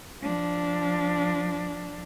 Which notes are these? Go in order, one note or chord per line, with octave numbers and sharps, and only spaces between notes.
F3 D4